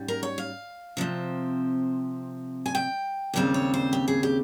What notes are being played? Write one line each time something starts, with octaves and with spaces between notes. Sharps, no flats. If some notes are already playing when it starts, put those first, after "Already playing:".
Already playing: G#2 G3 C#4
A#4
C#5
F5
C3 F3 C4
G#5
G5
D#2 C#3 G3 C4
C#5
C5
G4
G#4
G4